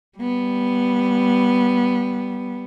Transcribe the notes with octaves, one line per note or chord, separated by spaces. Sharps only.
G3 B3